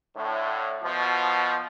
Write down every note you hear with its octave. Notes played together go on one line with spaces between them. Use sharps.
A2 D3
B2 F3